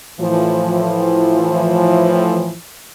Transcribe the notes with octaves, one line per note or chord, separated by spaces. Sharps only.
A2 E3 F3